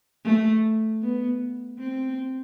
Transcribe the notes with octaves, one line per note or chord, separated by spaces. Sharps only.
A3
B3
C4